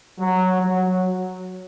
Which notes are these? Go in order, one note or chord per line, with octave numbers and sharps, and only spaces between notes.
F#3
F#3